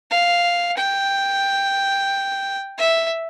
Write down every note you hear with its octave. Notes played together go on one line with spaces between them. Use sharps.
F5
G5
E5